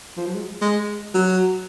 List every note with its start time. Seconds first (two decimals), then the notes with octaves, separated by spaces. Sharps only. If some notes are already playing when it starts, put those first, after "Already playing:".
0.17 F3
0.26 F#3
0.35 G#3
0.62 G#3
1.14 F#3